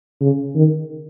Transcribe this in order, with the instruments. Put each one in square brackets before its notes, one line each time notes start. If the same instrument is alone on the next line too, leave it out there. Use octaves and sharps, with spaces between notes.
[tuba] C#3
D#3